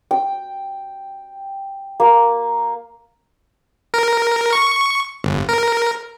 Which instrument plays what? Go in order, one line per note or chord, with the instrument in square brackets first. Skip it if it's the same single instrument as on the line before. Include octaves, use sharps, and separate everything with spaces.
[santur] G5
A#3
[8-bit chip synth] A#4
C#6
G1
A#4